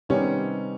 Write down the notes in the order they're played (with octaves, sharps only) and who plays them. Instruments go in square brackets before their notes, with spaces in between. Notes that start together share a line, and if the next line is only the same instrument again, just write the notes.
[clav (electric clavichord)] C3 D#3 G3 B3 D#4 [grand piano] C#4